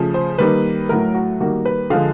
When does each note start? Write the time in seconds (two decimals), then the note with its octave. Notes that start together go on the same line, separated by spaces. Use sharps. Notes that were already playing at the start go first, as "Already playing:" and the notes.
Already playing: C#3 F3 A3
0.14 C5
0.38 D#3 G3 A#3 B4
0.89 A2 F#3 A3 A#4
1.14 F#4
1.40 D#3 G3 A#3 F#4
1.65 B4
1.90 D3 F3 G#3 F5